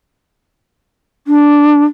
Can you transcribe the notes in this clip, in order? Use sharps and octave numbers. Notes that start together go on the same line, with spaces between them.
D4